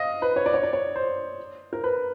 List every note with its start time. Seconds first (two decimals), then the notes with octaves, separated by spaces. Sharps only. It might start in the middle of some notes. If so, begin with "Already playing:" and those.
Already playing: D#5 F5
0.22 B4
0.36 C#5
0.46 D5
0.54 C#5
0.63 D5
0.73 C#5
0.96 C5
1.73 A#4
1.84 B4